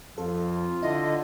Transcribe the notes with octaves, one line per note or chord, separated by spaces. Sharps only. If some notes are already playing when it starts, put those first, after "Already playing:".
F2 F4 A4
D3 E4 D#5